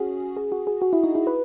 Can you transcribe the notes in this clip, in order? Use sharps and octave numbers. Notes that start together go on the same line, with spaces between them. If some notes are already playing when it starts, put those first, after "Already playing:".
Already playing: C#4 F#4 G#4
G#4
F#4
G#4
F#4
E4
D#4
E4
B4